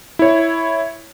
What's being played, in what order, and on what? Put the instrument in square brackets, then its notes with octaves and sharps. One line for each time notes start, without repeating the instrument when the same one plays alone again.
[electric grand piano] E4 C#5